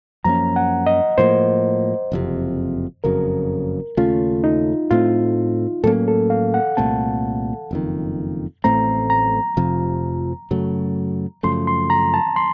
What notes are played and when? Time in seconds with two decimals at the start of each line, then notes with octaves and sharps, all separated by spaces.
0.24 F#2 F3 A#3 C#4 A#5
0.56 F#5
0.87 D#5
1.18 A2 F3 A#3 C5
2.12 F#1 F2 C3
3.04 F#1 F2 C#3 F#3 A#4
3.97 D#2 C#3 A3 C#4 F4
4.44 D#4
4.91 A2 A3 C4 F4
5.84 A2 F#3 A#3 C#4 A4
6.08 A4
6.30 F5
6.54 F#5
6.77 C2 A#2 A3 C4 A5
7.71 F#1 F2 D#3
8.64 A1 A2 A3 C4 A#5
9.10 A#5
9.57 F1 F2 C3 F3
10.51 F#2 C#3 F#3 A3
11.43 F#2 C#3 F3 A3 C6
11.67 C6
11.90 A#5
12.14 A5
12.36 C6